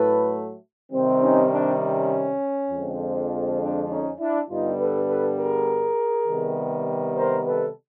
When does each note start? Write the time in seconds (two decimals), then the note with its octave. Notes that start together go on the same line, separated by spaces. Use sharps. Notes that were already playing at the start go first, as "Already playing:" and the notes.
Already playing: A2 F#3 A3 A4 B4
0.92 C3 D#3 G3 C4
1.22 C#4 D#4
1.51 C4 D4
1.81 C#4
2.70 F2 D3 F3 G#3 C4
3.59 C4 D4
3.89 C#4 D#4
4.19 D4 E4
4.49 G2 D3 G3 B3 D#4 F4
4.78 A4 B4
5.08 A4 B4
5.38 G#4 A#4
6.27 C3 D#3 G3 B3
7.16 A#4 C5
7.46 A4 B4